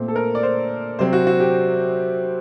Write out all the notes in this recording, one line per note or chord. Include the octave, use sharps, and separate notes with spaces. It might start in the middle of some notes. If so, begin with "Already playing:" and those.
Already playing: A#2 A3 C4
A4
A#4
D5
C5
C3 F#3 C4 C5
F#4
F#4
G4